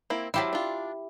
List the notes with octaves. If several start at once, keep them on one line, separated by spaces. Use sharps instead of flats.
A#3 C4 E4
F#3 E4 G4 C5 F5 A5
D4 F4